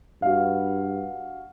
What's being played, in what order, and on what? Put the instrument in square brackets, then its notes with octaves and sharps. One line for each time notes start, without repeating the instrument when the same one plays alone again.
[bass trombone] G2 [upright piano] F#4 F5